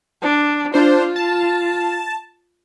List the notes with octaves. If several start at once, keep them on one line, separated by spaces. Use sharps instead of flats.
D4
D4 F4 C5
A5